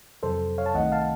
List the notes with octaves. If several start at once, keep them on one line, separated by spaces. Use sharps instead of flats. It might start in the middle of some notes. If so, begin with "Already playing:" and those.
F2 C3 F#3 A4 C5
C#5 F5
A5
C2 C3 D#3 A3 D#5 F#5
F5 A5